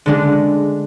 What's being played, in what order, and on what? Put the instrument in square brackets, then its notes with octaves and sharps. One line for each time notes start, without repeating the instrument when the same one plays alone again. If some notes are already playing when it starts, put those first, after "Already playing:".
[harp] D3 G#3 D4